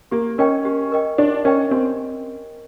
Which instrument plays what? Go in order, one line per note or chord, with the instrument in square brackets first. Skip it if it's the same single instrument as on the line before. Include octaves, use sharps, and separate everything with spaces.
[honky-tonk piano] A#3 [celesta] G4
[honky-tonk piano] C#4 [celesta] A#4 D#5 G5
[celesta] G4
A#4 D#5 G5
[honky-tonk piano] D4 [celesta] G4
[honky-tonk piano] C#4 [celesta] A#4 D#5 G5
[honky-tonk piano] C4 [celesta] G4